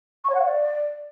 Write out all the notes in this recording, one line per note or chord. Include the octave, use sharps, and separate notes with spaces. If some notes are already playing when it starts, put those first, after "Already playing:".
C#6
C#5
F#5
F5
D5